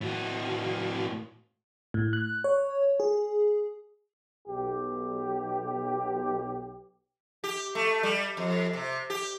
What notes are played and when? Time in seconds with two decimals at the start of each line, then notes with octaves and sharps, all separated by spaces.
0.01 A2 F#4
1.94 A2
2.13 F#6
2.44 C#5
3.00 G#4
4.48 B1 G4
7.44 G4
7.75 A3
8.03 G3
8.37 F2
8.73 C3
9.10 G4